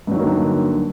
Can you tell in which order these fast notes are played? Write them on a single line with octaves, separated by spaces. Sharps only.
G2 F#3 D#3 A#3 D3